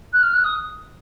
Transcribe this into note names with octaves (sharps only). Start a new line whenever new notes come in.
F#6
F6
F#6
D#6